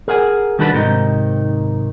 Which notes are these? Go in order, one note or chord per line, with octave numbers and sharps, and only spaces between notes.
G#4 A#4 F#5 G#5
D#3 G3 D4 F#4 A4 B4
G#2 C3 D#3 D#4